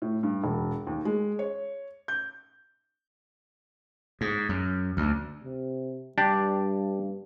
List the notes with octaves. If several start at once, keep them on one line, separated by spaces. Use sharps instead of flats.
A2
G2
E1
D#2
G#3
C#5
G6
G#2
F#2
D2
C3
G2 D4 G4 D5